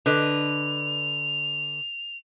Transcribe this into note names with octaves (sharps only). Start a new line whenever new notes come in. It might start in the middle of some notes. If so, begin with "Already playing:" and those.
D3 B4 D#5 F7